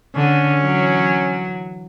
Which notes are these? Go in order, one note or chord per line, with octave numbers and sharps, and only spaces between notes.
D3 C#4
E3 F#3